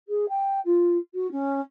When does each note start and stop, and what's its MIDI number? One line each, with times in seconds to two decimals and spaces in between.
0.08 0.25 68
0.28 0.59 79
0.65 0.97 65
1.14 1.30 66
1.31 1.60 61